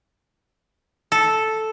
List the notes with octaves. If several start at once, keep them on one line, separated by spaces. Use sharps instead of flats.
A4